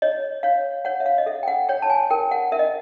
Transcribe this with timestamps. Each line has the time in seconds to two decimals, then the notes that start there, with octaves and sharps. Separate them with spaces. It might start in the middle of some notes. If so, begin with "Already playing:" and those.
0.02 C#5 D#5
0.43 C#5 F5
0.85 C#5 F#5
1.00 E5
1.06 F5
1.18 D#5
1.26 A4 E5
1.43 G5
1.48 F#5
1.69 C#5 G5
1.82 A5
1.90 G#5
2.10 A#4 G5
2.31 F#5
2.52 A#4 E5
2.59 D#5